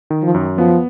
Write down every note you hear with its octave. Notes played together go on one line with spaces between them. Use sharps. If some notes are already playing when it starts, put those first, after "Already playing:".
D#3
F3
F#2
F3 B3